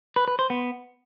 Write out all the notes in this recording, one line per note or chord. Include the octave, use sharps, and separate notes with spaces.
B4
B4
C5
B3